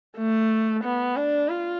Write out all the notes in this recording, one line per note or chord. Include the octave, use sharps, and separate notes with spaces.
A3
B3
D4
F4